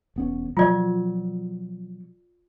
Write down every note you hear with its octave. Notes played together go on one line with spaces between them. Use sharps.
E1 B3 C#4
B2 F3 F#3 F4 D5